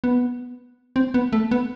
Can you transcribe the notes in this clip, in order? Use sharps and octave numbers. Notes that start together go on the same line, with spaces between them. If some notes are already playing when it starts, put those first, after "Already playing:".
B3
C4
B3
A3
B3